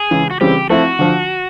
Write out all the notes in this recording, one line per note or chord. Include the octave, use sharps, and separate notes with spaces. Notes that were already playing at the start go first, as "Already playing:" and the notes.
Already playing: G#4
C#3 E3 G#3
F#4
C#3 E3 G3 C4 G4
F3 A3 C4 E4 F#4
D3 F3